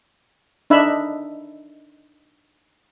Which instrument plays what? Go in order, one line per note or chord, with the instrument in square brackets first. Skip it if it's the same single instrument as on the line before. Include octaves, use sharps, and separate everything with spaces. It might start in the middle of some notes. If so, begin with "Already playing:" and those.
[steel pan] D4 D#4 E5 B5